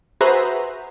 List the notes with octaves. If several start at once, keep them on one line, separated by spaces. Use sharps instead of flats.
F#4 G#4 B4 C5 E5 A#5